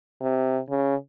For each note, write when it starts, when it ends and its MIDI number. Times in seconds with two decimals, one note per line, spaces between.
0.21 0.59 48
0.70 0.95 49